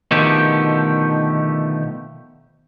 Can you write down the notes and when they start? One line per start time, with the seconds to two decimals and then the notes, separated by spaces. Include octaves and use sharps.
0.11 B2 D3 D#3 F3 A3 G4